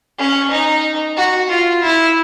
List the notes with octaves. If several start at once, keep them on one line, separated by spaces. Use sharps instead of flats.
C#4
D#4
F#4
F4
E4